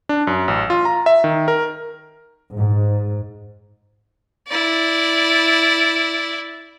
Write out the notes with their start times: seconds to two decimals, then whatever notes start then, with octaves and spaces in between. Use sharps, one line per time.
0.09 D4
0.27 F#2
0.48 A1
0.70 F4
0.85 A#5
1.06 E5
1.24 D#3
1.48 A#4
2.54 G#2
4.48 E4 D5